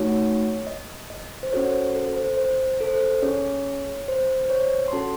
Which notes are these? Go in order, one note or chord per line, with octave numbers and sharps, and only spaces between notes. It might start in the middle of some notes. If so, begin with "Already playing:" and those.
Already playing: A3 D#4 F#4 C#5
D#5
D#5
C5
C#4 F#4 A4 C#5
C5
A4
A4
C5
C5
A4
C5
A4
C#4 G#4 C#5
C5
C5
C#5
C6
C#4 F#4 A4 A5